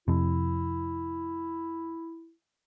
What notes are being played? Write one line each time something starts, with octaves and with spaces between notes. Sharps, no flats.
F2 C3 E4